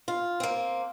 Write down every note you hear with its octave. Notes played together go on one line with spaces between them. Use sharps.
F4
A#3 C4